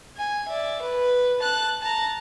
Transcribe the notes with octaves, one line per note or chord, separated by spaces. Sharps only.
G#5
D5 E5
B4
A5 F#6
A5 A#5